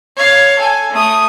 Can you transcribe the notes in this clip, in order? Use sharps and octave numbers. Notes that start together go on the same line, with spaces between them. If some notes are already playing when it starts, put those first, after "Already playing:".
C#5 F5
A4 G#5
A3 D#6